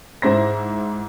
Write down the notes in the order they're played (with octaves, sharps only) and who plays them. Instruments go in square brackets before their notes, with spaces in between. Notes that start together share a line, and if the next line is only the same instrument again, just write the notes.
[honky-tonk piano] G#2 E4 C5 A#6